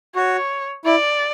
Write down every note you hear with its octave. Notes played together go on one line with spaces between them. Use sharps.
F#4 C#5
E4 D5